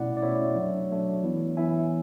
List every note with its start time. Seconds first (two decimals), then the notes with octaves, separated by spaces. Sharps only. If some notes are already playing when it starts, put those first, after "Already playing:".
Already playing: B2 A3 C#4 E4 D5 F#5
0.17 D5
0.22 B2 A3 C#4 E4 C#5 E5
0.56 F#3 A3 D4
0.91 F#3 A3 D4
1.24 E3 B3 E4
1.57 E3 B3 E4 E5 G#5